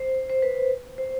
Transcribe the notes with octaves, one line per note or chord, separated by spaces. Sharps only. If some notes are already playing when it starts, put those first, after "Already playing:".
Already playing: C5
C5
B4
C5